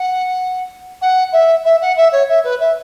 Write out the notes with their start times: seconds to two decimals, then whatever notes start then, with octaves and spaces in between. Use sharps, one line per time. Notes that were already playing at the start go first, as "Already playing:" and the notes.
Already playing: F#5
1.01 F#5
1.32 E5
1.64 E5
1.81 F#5
1.97 E5
2.12 C#5
2.28 E5
2.44 B4
2.60 E5